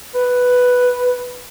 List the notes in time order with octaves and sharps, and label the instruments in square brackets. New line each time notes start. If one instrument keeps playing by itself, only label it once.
[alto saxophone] B4